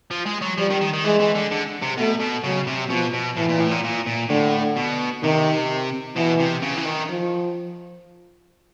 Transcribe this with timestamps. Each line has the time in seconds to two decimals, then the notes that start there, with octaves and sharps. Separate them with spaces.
0.11 F3
0.26 G#3
0.42 F#3
0.58 F3 G3
0.70 D#3
0.81 D#3
0.93 D#3
1.04 E3 G#3
1.20 E3
1.35 D3
1.51 D3
1.82 C3
1.97 B2 A3
2.20 B2
2.44 C#3 F#3
2.67 C3
2.90 B2 F3
3.13 B2
3.37 A2 E3
3.49 A#2
3.60 A2
3.71 A#2
3.84 A#2
4.07 A#2
4.30 A2 D3
4.76 B2
5.23 C3 D#3
6.16 B2 E3
6.40 C3
6.62 C#3
6.77 E3
6.86 D#3
7.09 F3